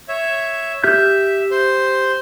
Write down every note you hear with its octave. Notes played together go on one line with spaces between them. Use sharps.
C#5 E5
G4 E5 F6 G6
C5